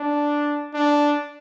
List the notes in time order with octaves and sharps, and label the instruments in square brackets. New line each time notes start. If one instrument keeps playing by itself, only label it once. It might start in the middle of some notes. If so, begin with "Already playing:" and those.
Already playing: [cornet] D4
D4